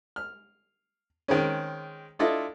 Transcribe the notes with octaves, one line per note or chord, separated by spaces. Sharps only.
F6
D#3 G#3 C4 C#4
D4 E4 F4 A4 D#5 E5